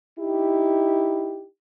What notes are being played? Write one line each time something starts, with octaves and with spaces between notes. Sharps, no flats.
D#4 E4 G4